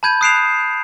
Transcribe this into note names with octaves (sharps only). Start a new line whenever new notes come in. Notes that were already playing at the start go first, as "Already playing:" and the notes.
A5 B5 G6 G#6 D#7
D#6 F#6 C7 D7 E7 F7